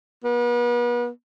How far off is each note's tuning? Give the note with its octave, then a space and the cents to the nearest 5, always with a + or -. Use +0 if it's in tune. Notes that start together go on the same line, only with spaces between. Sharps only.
B3 -40